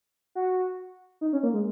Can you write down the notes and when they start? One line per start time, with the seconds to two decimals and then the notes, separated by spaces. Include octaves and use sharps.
0.35 F#4
1.21 D#4
1.33 C#4
1.43 A#3
1.54 G#3